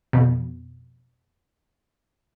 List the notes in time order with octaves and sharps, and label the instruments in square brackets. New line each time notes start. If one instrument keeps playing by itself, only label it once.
[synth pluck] F2 B2